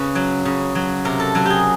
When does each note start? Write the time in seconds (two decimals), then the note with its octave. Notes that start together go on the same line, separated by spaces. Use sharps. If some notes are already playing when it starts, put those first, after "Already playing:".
Already playing: C#3 B4
0.15 F#3
0.45 C#3
0.75 F#3
1.05 C3 A#4
1.20 A4
1.35 F#3 A#4
1.46 G4 G#4